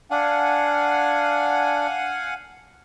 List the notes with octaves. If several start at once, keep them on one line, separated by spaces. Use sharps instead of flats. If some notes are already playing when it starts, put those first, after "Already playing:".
D4 F5 F#5 G#5